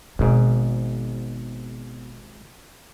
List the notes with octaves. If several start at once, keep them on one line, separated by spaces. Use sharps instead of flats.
G#1 G#2 B2